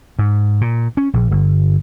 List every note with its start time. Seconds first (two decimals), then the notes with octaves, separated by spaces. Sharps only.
0.19 G#2
0.61 A#2
0.97 C#4
1.14 A#1
1.31 G1